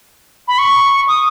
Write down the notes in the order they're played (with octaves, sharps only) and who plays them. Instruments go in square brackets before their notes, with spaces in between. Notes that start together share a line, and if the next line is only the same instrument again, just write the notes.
[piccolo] B5
C#6
D#6